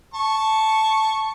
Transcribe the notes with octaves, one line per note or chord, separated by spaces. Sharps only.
A5 C#6